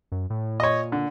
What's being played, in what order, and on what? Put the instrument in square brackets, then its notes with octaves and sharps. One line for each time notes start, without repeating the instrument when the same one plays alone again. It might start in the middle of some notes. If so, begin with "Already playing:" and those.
[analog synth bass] F#2
A2
[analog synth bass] A#2 [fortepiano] C#5 D#5
[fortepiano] D3